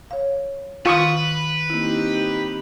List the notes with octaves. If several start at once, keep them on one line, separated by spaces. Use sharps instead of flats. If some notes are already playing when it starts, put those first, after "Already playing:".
C#5 F5
D#3 F4 B4 F5 C#6 D#6 F6
A#3 C4 D#4 E4 G4